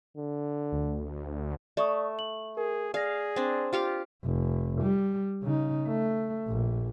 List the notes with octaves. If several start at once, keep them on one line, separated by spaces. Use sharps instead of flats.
D3
D2
A3 D5 C#6 D#6
F#7
G#4 A#4
G#4 D5 F5 A#6
C4 D4
F4 G4 F5
F1
G3
C#3 D#4
A3
A#1